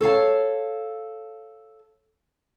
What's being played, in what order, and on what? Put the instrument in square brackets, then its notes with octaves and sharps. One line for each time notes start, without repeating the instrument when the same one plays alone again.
[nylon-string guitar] A4 C#5 F5 A5